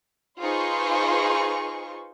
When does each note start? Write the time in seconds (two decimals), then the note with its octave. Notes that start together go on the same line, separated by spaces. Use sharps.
0.40 D#4 F4 G#4 B4 C5 C#6